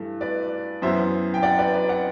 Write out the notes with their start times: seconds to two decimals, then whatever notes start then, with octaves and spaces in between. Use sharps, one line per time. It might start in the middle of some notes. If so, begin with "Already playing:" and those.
Already playing: G2 E3 A3
0.21 B4 D5
0.82 F#2 E3 B3 C5 E5
1.34 G5
1.43 D5 F#5
1.59 B4 D5
1.74 B4 D5
1.89 D5 F#5